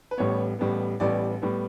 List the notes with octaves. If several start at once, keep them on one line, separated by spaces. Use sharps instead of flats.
B4
A1 A2 G3 B3 C#5
A1 A2 G3 B3
A1 A2 G3 B3 D5
A2 G3 B3